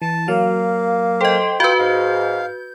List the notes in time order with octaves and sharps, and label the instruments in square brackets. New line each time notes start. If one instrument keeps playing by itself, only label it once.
[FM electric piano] E3 [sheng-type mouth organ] A5
[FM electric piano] F#3 F5 [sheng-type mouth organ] A#3
[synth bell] A4 D#5 [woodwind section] C5 G5
[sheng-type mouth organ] F4 G5 [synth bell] F#4 B4 [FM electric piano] G6
[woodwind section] G#2 [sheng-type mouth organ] F5